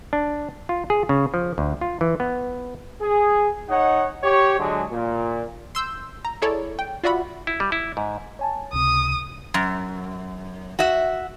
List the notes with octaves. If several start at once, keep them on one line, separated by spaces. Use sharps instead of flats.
D4
F4
G#4
C#3
F3
D2
F4
E3
B3
G#4
D#4 C#5 D#5 F#5
G4 C#5
D3 F#3 G#3
A#2
C6 E6 G6
A#5
E4 G#4 A4 C#5 D5
G5
F4 F#4 D5 E5 F#5 B5
E4
G3
E4
G#2
C#5 G#5 A5
C#2 C3 D#6
F#2
F#4 E5